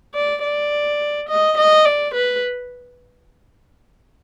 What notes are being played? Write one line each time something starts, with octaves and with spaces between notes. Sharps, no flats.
D5
D5
D#5
D#5
D5
B4